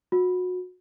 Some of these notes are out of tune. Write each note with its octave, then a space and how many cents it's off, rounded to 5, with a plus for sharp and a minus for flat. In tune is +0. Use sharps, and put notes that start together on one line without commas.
F#4 -30